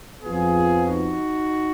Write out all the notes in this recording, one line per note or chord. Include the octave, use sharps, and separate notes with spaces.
F2 F3 B3 F4 G#4
D#4 F#4